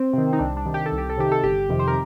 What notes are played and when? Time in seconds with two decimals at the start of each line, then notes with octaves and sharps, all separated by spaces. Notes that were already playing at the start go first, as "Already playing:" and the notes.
Already playing: C4
0.13 C3 D#3
0.33 D#4
0.39 C2 D4
0.57 D4
0.66 C3 D#3
0.74 G4
0.86 A4
0.92 C2
0.98 G4
1.10 A4
1.17 C3 D#3 G4
1.32 A4
1.43 G1 G4
1.69 F2 C3 D#3
1.79 C5
1.88 A#4